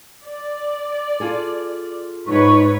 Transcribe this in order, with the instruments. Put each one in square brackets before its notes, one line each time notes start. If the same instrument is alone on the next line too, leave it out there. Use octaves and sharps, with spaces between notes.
[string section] D5
[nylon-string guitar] F4 G#4 A4
[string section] G#2 B4 C#5 [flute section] D#4 C#6